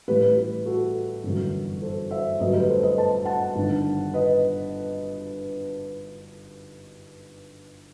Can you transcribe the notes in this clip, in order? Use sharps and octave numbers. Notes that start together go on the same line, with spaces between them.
A1 A2 G3 G4 B4
G4 B4
F#4 A4
G1 F#2 E3
A4 C5
C5 E5
G1 F#2 F#3 A3 B4 D#5
G4 B4
A4 C5
B4 D#5
A5
F#5 A5
G1 G2 D#3
B4 D#5